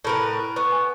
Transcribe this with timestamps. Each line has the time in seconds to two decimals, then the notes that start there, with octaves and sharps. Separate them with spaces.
0.04 A2 A#4 B4
0.56 B3 C#6
0.72 G#5